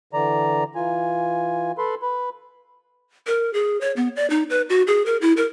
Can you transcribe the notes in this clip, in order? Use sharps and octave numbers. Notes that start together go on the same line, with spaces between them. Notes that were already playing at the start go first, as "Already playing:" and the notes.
D3 E3 D5 A#5
E3 F4 G#5
A4 B4 B5 C6
B4 B5
A#4
G#4
C#5
B3
D5
D#4
B4
F#4
G#4
A#4
E4
A#4